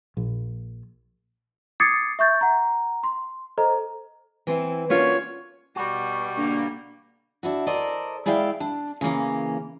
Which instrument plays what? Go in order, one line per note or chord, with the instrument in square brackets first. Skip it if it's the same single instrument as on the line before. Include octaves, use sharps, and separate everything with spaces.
[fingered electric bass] A#1
[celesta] D6 D#6 G#6 A6 C7 C#7
E5 C#6 G6 A6
F#5 A#5
C6
A4 C5 D#5 A#5
[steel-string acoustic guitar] E3 C4 E4
[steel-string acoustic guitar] A#3 D4 F#4 [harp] C#4 F4 [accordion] C#5
[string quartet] B2 G3 [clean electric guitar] F#4
[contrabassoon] D3 [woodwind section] A#3
[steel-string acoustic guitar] D4 E4 F#4
A4 A#4 C5 D5 D#5
G#3 E4 D5 E5 F5 G5
D4
C#3 E3 A#3 C#4